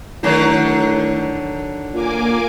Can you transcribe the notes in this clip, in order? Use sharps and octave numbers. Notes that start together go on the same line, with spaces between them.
A2 D3 D#3 F#3
A#2 A#3 G#5 D6